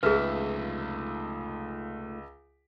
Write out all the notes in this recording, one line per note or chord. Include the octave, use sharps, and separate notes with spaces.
C#2 A3 D#4 F4 G#4 B4 E5